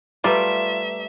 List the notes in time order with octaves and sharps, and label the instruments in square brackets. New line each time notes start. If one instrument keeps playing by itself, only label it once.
[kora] G3 A3 G4 [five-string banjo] F4 [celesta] B4 A#5 D6 [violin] E5